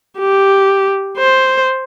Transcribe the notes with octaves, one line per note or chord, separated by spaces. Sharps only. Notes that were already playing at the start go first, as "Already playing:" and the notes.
G4
C5